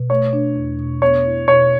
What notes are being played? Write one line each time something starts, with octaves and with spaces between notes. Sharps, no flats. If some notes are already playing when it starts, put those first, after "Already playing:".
Already playing: B2
A3 C#5
D4
E2
B2
B3 C#5
E4
B2 C#5